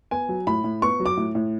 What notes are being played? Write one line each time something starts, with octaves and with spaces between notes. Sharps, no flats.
B3 G#5
F#3
A2 B5
A2
B3 C#6
F#3
D6
A2
A2